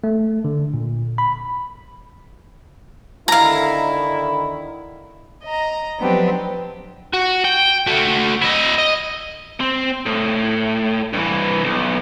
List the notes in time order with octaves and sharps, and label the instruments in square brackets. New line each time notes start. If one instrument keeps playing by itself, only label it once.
[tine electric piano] A3
D3
A#2
B5
[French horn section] D3 D#3 E4 [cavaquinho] F5 A#5
[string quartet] D#5 A#5
F3 F#3 B3 C4 D4 G4
[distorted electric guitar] F#4
G5
A3 F#4
E4 D#5
D#5
[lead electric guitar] C4
A2
G2 E3
B1